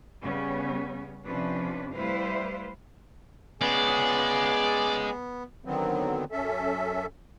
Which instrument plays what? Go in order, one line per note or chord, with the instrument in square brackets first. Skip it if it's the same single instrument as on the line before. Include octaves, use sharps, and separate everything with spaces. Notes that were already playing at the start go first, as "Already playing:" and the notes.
[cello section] C#3 G3 B3 C#4
C3 F3 C#4 D4 B4
G3 A3 E4 B4 C5 F5
[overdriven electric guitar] G#3 C#4 [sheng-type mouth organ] B3 [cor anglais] G#4 [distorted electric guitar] D5
[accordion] D3 D#3 F#3 B3 C4
F#2 C#4 A4 E5